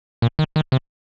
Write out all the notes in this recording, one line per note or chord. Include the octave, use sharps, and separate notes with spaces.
A#2
D#3
D#3
C3